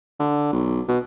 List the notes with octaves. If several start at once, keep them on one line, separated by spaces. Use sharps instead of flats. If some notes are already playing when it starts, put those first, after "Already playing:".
D3
B1
B2